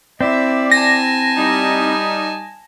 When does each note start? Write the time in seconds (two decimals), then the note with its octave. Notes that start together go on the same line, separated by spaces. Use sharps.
0.21 C4 E4 D5 E5
0.72 G#5 A5 A#6
1.37 G3 D#4